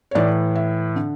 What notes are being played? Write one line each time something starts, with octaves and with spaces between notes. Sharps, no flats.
C#5
A2 E3 D5
E5
D3